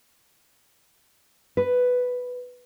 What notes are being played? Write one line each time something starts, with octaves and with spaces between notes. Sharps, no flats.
B4